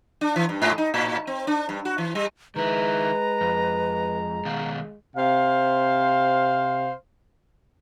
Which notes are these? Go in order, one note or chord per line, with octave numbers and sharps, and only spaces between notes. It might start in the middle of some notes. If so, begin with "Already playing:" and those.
D4
E3
G2
G#2
D#4
A2
C4
D4
G2
F#4
E3
G3
D#3 G#3 E4 B4 A#5
F2
B2 D#3 F5
C3 C5 F5